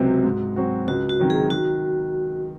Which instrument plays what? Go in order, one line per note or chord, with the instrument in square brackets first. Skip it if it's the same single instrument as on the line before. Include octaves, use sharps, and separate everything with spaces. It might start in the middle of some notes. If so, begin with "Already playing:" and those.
Already playing: [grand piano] C#2 C3 F#3 C4 [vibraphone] F#4
[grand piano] G#2
F#3 C4 F#4
[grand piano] C#2 [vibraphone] F#4
[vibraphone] F#4
[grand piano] C3 D#3 F#3
[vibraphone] G#4
[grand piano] D#3 [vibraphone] F#4